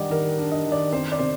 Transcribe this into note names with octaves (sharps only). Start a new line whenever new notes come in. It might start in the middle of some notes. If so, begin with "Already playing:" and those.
Already playing: D#3 G3 D4 D5 D#5 F#5
D#3 A#4
D4
D#5
D#3
D5
C4 C5
D5
C3 C5